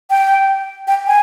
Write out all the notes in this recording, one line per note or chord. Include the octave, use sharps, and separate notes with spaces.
G5
G5
G#5